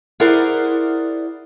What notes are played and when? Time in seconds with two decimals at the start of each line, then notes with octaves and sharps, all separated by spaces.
0.20 E4 G#4 A#4 C5 D5 F#5